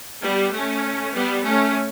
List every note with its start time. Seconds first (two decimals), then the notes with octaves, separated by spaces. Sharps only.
0.23 G3 B3
0.53 A3 C#4
1.15 G3 B3
1.45 A3 C#4